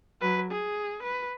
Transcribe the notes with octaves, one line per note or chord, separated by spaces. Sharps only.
F#3 B4
G#4
B4